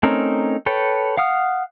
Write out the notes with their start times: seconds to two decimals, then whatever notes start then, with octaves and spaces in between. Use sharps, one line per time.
0.03 A3 C4 C#4 D#4 A#4
0.66 A4 B4 C#5 G5
1.17 F5 F#5 D#6 F6